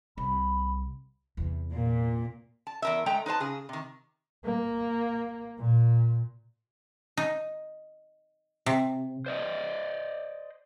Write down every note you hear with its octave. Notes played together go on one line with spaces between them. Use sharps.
C2 B5
E2 C3
A#2
A5
E2 A#4 E5
G#3 A3 G5 A#5
D#4 B4 C5 A5
C#3 G#4
C3 D#3
A#3
A#2
D#4
C3
C5 D5 D#5